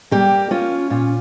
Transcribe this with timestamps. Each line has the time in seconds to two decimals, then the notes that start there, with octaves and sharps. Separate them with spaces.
0.11 G3 A#3 G4
0.51 C#4 F4
0.90 A#2 F4